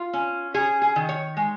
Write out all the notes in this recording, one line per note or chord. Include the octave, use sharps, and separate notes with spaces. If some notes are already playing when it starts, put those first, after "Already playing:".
Already playing: F4
C#4
C#4 G#4
G#4
D#3
C#5
G#3